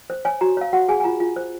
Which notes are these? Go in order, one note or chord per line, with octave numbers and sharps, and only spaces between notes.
C5
C#5 G#5
F#4 A#5
C#5 F5
F#4 F#5
G#4 G#5
G#5
F4 A#5
F4
C5